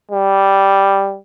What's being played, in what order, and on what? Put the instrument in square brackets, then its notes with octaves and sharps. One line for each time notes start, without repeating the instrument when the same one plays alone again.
[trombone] G3